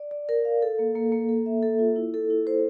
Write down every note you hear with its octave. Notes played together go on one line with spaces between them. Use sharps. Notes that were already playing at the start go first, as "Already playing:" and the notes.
Already playing: D5
D5
A#4
F5
A4
A#3
A#3
A#3
A4
E5
A4
F4
E4
A4
E4
C5